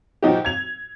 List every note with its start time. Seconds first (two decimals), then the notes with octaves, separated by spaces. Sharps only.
0.22 A#2 F3 D#4 F#4 G4
0.45 G#6 F7